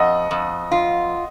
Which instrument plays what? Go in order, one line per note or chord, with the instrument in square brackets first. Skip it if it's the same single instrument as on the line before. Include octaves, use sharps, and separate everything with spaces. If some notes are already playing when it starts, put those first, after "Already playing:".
Already playing: [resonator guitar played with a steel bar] F2 [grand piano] D#5 F#5
[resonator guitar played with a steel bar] F2
F4